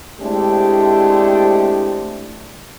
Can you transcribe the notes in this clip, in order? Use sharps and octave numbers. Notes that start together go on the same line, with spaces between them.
G#3 A3 C4 D4 E4 G4